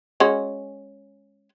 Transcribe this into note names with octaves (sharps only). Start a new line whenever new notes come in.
G#3 C#4 F#4